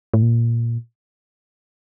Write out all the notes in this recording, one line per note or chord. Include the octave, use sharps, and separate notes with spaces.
A2
A#2